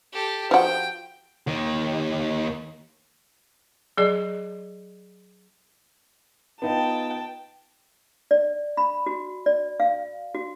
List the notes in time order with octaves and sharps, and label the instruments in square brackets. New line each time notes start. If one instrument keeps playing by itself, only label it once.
[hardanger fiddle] G4 A4
[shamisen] F3 F#4 [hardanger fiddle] G5
[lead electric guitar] D#2 D#3
[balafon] F#3 G#4 D5
[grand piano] B3 D#4 F4 [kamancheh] G5 A5
[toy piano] D5
B5
F#4
D5
F5
F#4